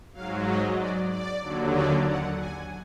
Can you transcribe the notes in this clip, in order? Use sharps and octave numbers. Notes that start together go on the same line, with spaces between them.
G#2 F#3 F5
D#5
D5
D5
D#2 D3 F#3
D5
F#5
G#5